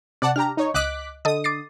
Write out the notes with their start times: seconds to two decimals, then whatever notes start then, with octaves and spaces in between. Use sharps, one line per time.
0.22 C3 D5 F#5 A5
0.36 D4 G4 A#5 F6
0.57 D#4 C#5
0.74 C#2 D#5 D6 F#6 B6
1.25 D3 A4 D#5 D#6
1.44 D6 A6 C7